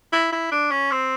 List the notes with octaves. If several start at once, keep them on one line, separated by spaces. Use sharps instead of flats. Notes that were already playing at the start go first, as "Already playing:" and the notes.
E4
E4
D4
C#4
C4